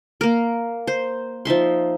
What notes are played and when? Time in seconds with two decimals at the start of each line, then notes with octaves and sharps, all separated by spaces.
0.21 A#3 A#4
0.87 C5
1.45 F3 D#4 E5 C6